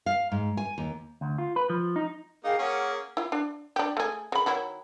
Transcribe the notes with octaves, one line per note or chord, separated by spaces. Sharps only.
F5
G#2
G#5
D#2
D2
F4
B4
F3
D#4
A#3 D#4 G#4 F5 G5
A#3 C#4 G#4 A#4 F#5
E4 F4
D4
D4 G4
A3 G#4
C#3 B5
D#3 F#3 E4